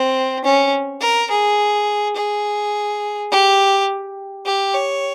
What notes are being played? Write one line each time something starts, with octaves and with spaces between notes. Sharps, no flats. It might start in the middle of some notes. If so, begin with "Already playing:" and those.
Already playing: C4
C#4
A#4
G#4
G#4
G4
G4
C#5